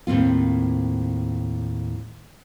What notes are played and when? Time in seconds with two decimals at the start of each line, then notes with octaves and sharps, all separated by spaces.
0.07 D#2 A2 C4 F4